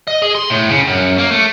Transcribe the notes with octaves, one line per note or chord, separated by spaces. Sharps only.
D#5
G#4
C6
A2
C#3
F#2
A#3
A3